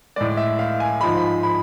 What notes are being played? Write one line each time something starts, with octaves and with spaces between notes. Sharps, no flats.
A2 G#3 D5
E5
F5
G#5
G#2 F3 G#3 B5
B5